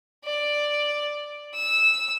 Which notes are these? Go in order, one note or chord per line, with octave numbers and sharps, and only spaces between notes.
D5
E6